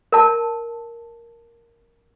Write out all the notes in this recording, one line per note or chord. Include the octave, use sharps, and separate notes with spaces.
A#4 A5